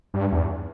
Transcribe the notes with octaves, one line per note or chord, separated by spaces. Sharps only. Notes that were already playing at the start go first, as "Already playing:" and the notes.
G2
E2